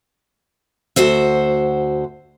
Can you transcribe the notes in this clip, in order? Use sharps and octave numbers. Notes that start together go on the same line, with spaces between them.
D2 F#4 C5 E5